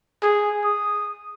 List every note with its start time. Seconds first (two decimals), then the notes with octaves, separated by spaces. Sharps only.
0.22 G#4
0.64 D#6